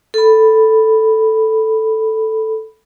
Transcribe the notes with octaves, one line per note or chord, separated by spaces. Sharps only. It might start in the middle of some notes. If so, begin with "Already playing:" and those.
A4 B5